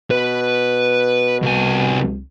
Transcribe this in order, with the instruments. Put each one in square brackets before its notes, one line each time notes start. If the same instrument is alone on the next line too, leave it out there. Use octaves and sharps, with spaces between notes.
[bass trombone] B2 [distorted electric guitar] B4
[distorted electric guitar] C2 G#5